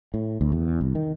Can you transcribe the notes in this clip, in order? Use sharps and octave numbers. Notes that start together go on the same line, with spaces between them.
A2
D2
E2
C2
D#3